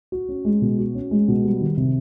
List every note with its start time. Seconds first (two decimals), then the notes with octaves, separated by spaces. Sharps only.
0.12 F#4
0.29 C#4
0.45 G#3
0.62 B2
0.79 F#4
0.95 C#4
1.11 G#3
1.28 B2
1.45 G3
1.60 D#3
1.77 C3